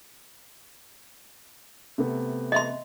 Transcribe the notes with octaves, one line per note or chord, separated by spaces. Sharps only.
C3 A3 B3
D#5 E5 C6